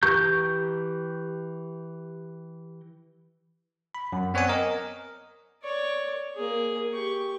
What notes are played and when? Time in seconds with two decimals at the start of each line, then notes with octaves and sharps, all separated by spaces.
0.03 E3 G4 A#5 C#6 G6
3.95 B5
4.12 F#2
4.34 B3 C4 C#5 D5 F#5 G#5
4.48 A#4 D#5
5.63 C#5 D5
6.36 A#3 G#4
6.93 G4 C#6